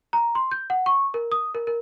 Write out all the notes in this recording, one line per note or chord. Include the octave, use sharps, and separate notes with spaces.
A#5
C6
G6
F#5
C#6
A#4
D#6
A#4
A#4